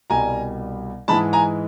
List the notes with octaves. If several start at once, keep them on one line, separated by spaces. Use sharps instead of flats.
C2 B2 G3 G#5 A#5
G#2 E3 G#3 A5 B5
G#5 A#5